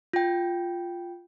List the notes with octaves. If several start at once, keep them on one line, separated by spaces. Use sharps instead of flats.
F4 G5